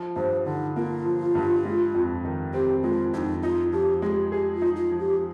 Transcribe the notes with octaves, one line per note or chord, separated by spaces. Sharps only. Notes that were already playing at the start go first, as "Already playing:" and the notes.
Already playing: F3
G2 C5
D3 D#4
A#3 F4
F3
G2
G#3
F2
D#3
C4 G4
G#3 F4
F2 D#4 F4
D#4 F4
F3 G4
G#3 G4 G#4
G4 G#4
F4
D#4
F4
F3
G4